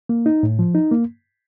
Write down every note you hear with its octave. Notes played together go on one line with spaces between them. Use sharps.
A#3
D#4
A2
F3
D#4
A#3